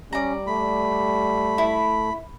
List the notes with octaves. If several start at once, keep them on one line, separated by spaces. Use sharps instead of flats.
G3 C#4 D5 A#5
A3 B5
E4